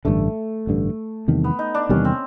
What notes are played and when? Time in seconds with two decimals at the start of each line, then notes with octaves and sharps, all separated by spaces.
0.05 A1 G2 D3 A3
0.67 A1 G2 D3
1.28 E2 C3 D#3 G3
1.44 B3
1.59 D#4
1.74 D4
1.89 E2 C3 D#3 G3 C#4
2.05 C4